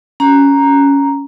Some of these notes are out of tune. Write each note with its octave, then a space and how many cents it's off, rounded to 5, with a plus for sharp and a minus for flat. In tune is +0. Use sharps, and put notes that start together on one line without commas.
C#4 +10 A#5 +0